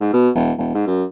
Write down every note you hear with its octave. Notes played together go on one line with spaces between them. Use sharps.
G#2
B2
E1
E1
G#2
F#2